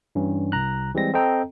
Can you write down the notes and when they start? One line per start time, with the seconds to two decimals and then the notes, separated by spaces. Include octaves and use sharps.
0.15 G2 E3 C#4
0.52 C2 A#5 F#6
0.94 E3 G3 G#3 C4 A#6
1.14 C4 A4 D#5 G5 A#5